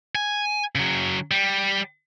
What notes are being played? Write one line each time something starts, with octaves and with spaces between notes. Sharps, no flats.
G#5
C#3 F#3
G3